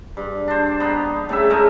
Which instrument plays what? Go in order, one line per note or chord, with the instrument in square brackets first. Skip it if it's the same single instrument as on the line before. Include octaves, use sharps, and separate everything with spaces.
[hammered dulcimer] G2
D4 C5
B3 D#4
A2 C#3 E5
G#3 A3 D#4 A#4